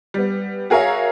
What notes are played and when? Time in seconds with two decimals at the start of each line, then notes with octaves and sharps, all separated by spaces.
0.14 G3 B3
0.70 F#4 G#4 A#4 C#5 E5 F5